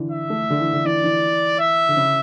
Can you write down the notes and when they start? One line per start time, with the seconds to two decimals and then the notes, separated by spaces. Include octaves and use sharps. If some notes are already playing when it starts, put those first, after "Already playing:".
Already playing: D3 E3
0.11 E5
0.30 A3
0.50 D3
0.60 E3
0.73 D3
0.85 E3 D5
1.04 E3
1.60 E5
1.89 D3
1.97 C#3